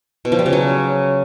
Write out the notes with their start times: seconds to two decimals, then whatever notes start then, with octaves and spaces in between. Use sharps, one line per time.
0.25 B2
0.32 F3
0.39 G3
0.46 C#3
0.53 F#3